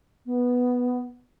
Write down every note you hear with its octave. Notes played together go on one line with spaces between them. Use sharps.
B3